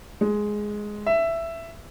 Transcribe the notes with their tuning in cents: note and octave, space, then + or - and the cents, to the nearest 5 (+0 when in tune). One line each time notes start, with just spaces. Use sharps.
G#3 +5
E5 +10